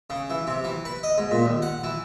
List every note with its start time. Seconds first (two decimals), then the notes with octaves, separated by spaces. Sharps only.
0.10 C#3
0.30 E3
0.47 C3
0.64 E3
0.85 B4
1.03 D#5
1.18 G#2
1.31 A#2
1.45 D#2
1.62 F#5
1.84 E3